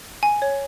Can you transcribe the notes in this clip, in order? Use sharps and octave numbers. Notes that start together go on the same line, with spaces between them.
G#5
C#5